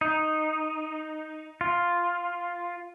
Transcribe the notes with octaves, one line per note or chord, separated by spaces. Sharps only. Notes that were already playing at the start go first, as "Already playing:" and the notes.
D#4
F4